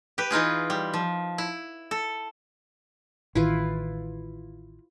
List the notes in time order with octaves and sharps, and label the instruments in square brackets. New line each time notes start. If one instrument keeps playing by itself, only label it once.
[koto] G4 B4
E3 D#4 F4 G#4
G3
F3
E4
A4
[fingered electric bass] A1 D#3 [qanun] E4 F4 B4